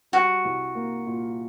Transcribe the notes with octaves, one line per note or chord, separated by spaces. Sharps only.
G3 F#4
C2
A#3
A#2